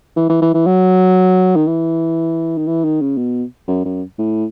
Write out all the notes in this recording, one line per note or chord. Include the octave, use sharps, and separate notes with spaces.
E3
E3
E3
E3
F#3
D#3
E3
D#3
E3
D#3
C#3
B2
F#2
F#2
A2